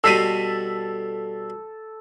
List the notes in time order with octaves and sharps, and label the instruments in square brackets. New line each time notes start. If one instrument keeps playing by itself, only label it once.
[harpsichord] B2 G3 C5 [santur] A4 [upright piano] E6 B6 D#7